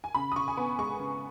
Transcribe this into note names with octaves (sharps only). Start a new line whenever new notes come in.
G#5
C#3 B5
D#6
C#3 C#6
G#5
B3 B5
G#3 C#6
C#3